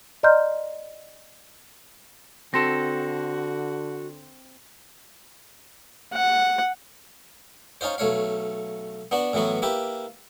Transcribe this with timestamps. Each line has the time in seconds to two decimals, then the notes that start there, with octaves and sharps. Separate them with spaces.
0.23 D5 D#5 A#5 C6 F6 G6
2.54 D3 C4 F#4 A4 C6 A#6
6.13 F#5
7.81 C#4 D#4 F4 C5
7.98 B1 A3 C#5 F5
9.11 B3 D4 F#4
9.33 A2 E3 F#3 B3 F#4
9.62 A#3 E4 G4 B4